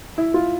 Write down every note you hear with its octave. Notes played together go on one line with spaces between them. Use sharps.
E4
F4